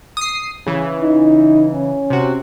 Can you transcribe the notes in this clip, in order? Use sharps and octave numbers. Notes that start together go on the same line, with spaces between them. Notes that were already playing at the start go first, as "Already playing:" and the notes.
D#6 C7
C#3 E3
D#4
C#4
C3 F#4